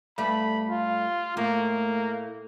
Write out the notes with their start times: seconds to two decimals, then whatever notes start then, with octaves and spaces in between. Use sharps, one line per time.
0.18 G2 G3 A3 B5
0.69 F4
1.37 A2 A3 A#3